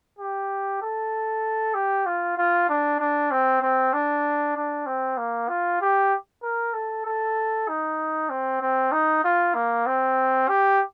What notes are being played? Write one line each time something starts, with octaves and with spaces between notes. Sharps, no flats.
G4
A4
G4
F4
F4
D4
D4
C4
C4
D4
D4
C4
A#3
F4
G4
A#4
A4
A4
D#4
C4
C4
D#4
F4
A#3
C4
G4